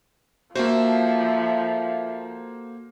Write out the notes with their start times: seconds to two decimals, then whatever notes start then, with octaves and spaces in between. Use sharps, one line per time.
0.55 F3 A#3 F#4 A4 C5 E5 A5